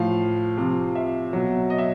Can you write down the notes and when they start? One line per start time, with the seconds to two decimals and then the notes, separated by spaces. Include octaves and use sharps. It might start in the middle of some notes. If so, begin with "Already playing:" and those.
Already playing: A2 F3 F5
0.57 C3 F3
0.95 E5
1.33 B2 F#3
1.70 D#5
1.78 E5